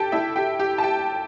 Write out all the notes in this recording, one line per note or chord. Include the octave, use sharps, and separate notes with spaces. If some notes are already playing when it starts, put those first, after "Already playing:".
Already playing: G4 A4 G5 A5
E4 E5
G4 G5
G4 G5
A5
G4 G5